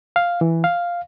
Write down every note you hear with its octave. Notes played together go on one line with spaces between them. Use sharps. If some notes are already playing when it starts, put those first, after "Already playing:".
F5
E3
F5